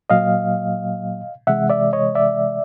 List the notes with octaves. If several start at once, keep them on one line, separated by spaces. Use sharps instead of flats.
A#2 F#3 A#3 D#5 F5
C3 E3 G#3 E5 F#5
D5 E5
C#5 D#5
D5 E5